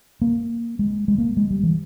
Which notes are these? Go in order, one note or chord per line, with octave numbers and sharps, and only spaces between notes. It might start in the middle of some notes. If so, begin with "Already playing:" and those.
A#3
G#3
G#3
A#3
G#3
G3
E3